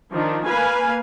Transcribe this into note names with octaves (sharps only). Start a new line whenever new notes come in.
D#3 F3 D4
A#3 B4 F5 G#5